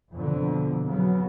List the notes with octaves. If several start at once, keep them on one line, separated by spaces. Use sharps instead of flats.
F2 B2 D3
C#3 F#3 B3